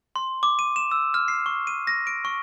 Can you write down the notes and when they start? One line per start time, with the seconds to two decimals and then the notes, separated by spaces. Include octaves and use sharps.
0.16 C6
0.43 D6
0.59 D#7
0.76 E7
0.91 E6
1.14 F6
1.28 C7
1.46 C#6
1.67 D#7
1.87 A#6
2.07 D7
2.25 C#6